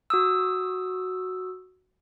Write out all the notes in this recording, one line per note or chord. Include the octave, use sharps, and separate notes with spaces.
F#4 D#6 E6